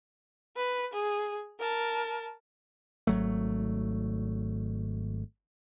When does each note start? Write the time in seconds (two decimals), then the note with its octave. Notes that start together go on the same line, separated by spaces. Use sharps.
0.56 B4
0.93 G#4
1.59 A#4 A5
3.07 G#1 F#3 A3